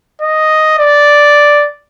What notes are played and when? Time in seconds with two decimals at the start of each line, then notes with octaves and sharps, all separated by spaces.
0.21 D#5
0.79 D5